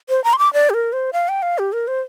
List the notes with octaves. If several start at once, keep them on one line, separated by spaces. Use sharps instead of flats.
C5
A#5
C6
D6
D5
G4
A#4
C5
F5
G5
F5
G4
A#4
C5